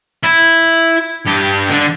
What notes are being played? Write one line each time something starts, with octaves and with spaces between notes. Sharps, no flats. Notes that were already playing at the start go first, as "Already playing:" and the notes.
E4
G2 G4
D3 D4